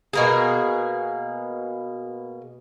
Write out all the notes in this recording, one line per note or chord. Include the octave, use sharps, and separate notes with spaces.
B2 A#3 G#4